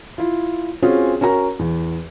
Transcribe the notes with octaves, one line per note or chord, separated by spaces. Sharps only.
E4 F4
C4 C#4 F4 F#4 G#4
C#4 F#4 A#4 A#5
E2